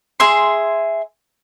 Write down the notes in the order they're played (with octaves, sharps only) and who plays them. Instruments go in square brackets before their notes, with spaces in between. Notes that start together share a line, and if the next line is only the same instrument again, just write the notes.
[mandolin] G#4 E5 C6